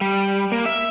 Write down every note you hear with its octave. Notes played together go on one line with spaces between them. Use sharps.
G3
A#3
E5